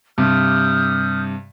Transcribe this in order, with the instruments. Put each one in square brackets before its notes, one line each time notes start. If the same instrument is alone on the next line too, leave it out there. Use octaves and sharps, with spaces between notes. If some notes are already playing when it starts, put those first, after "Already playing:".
[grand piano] G2 C3 [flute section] D#6 F6 G6